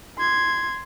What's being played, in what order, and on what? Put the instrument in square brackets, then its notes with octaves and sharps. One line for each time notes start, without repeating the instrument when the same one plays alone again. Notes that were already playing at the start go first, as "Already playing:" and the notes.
[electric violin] C6 G#6